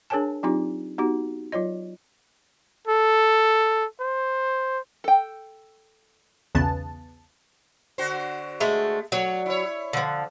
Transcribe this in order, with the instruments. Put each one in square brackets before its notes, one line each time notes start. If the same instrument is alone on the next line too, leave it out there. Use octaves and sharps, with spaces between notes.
[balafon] D4 G#4 A#4 C#5 G#5 A5
F#3 C4 D#4 F4 G4
B3 D#4 F#4 G4
F#3 F4 C#5 D#5
[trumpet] A4
C5
[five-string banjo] A4 G5
[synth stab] B1 E2 C#3 B3 A5
[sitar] D3 F#4 C5
[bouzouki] G#3 A3
[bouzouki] F#3 [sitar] A3 C#5 D5
[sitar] E4 C#5
[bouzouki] D3 F3